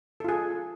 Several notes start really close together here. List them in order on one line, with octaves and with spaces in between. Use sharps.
A4 F4 G#4